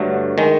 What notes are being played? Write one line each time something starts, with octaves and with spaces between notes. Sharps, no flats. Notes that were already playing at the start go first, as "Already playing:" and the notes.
Already playing: G2 D3 F#3 A3
D#3 G#3